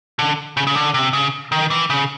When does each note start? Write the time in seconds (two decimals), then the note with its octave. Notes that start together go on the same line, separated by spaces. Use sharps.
0.19 D3
0.57 C#3
0.67 C#3
0.75 D3
0.94 C3
1.13 C#3
1.52 D#3
1.70 E3
1.90 C#3